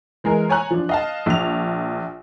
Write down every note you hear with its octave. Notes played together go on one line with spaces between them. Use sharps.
E3 G#3 G#4 A#4
C#5 G#5 A#5 F#6
F3 D4
D#5 F5 A5
A#1 F7